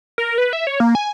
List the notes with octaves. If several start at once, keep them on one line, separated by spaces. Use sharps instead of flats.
A#4
B4
E5
C#5
A#3
G#5